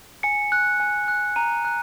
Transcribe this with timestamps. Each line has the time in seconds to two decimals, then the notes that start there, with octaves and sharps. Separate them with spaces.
0.23 G#5 C#7
0.52 F#6
0.80 G#5
1.08 F#6
1.36 A#5 D#7
1.65 F#6